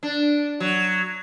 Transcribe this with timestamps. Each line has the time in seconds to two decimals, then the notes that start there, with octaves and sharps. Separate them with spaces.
0.03 D4
0.60 F#3